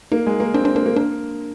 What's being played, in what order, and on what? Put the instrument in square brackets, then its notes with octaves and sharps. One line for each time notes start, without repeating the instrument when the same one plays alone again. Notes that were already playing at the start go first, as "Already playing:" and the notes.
[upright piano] A#3 [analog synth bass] D#4
[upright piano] G#3
A#3
[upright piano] C4 [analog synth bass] D4
[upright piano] C4 [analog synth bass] D4
[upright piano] A#3 [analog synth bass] D4
[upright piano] A#3
[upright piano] A#3 [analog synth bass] D4